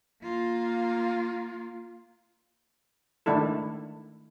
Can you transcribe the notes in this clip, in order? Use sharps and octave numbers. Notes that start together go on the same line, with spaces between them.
A#3 F4
D#3 G#3 A3 D4 E4 A4